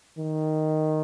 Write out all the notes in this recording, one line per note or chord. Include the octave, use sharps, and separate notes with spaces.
D#3